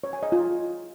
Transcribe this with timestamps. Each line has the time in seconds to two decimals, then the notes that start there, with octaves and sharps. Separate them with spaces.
0.04 C#5
0.13 G#5
0.23 D#5
0.32 F4